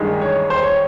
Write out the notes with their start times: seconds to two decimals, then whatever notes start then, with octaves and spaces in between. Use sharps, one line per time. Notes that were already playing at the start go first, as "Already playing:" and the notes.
Already playing: A1 G2 D#3 G#3
0.21 C#5
0.50 C5
0.63 C#5